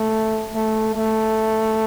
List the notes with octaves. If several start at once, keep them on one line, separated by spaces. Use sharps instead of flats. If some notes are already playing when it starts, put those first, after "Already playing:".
Already playing: A3
A3
A3